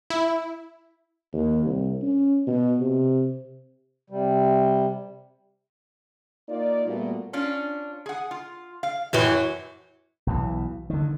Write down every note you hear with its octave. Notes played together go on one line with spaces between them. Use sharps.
E4
D#2
C2
C#4
B2
C3
C3 G3
A#3 D#4 F4 D5
A#2 G3 A3 B3 F#4
C#4 D4 F4
G#4 F#5
F4
F5
F#2 E3 F#3 G4
B1 B2 E3
D3 D#3